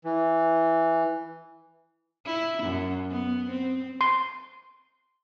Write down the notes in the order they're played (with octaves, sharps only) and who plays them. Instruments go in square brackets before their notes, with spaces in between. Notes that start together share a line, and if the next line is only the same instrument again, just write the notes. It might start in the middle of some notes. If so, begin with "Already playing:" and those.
[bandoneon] E3
[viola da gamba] E4
F#2
B3
C4
[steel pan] C6